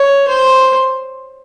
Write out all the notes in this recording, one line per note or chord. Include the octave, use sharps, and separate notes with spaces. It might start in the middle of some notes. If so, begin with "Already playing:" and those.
Already playing: C#5
C5